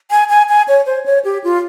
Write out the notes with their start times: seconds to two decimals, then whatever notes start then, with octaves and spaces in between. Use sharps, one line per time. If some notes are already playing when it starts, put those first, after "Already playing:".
0.11 G#5
0.29 G#5
0.49 G#5
0.68 C#5
0.86 C5
1.06 C#5
1.25 G4
1.44 F4